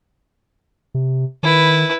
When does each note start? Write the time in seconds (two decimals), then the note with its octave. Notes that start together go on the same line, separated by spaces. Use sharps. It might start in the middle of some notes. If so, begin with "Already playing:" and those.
0.94 C3
1.43 D#3 E4 B4